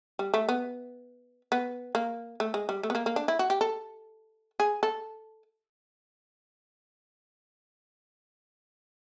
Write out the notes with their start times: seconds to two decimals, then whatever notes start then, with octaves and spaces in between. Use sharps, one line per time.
0.19 G3
0.34 A3
0.49 B3
1.52 B3
1.95 A#3
2.40 A3
2.54 G#3
2.69 G3
2.83 A3
2.90 B3
2.95 A#3
3.06 A#3
3.16 D4
3.28 E4
3.39 F#4
3.50 G4
3.61 A4
4.60 G#4
4.83 A4